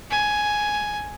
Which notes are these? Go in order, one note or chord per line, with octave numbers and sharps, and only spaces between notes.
G#5